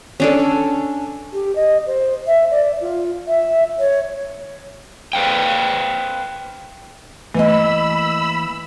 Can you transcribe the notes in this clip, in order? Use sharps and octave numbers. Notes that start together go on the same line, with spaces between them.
C#4 D4 A4
G4
D#5
C5
E5
D5
F4
E5
C#5
B4 C5 F5 G5
E3 A3 A#3 D#5 B5 E6